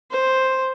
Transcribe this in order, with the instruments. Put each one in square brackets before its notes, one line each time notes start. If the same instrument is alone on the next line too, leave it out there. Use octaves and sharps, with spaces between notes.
[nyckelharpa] C5